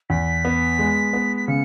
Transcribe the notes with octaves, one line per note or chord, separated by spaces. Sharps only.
E2 B6
B3
G#3
B3
B6
C#3 C#7